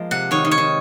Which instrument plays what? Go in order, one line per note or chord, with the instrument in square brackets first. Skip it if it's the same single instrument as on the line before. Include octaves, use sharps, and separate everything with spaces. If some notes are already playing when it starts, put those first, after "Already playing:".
Already playing: [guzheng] F3 G#3 A#3
[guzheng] C3 [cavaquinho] F#5
[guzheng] D#3 [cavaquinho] C#5
[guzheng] D#3
[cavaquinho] C#5
[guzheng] D#3